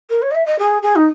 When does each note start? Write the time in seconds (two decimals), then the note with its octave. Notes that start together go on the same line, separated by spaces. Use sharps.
0.10 A#4
0.22 C#5
0.31 D#5
0.34 E5
0.46 D#5
0.58 G#4
0.82 G#4
0.95 D#4